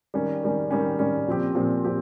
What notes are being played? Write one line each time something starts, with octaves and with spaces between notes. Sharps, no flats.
D#3 G3 C#4
D#3 G3 C#4
D#3 G3 C#4
D#3 G3 C#4
A#2 F3 C4 G4
A#2 F3 C4 G4
F3 C4 G4